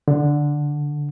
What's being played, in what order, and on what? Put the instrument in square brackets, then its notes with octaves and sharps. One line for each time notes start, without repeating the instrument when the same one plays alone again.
[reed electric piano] D3